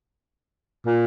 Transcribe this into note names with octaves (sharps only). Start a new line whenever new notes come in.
A#2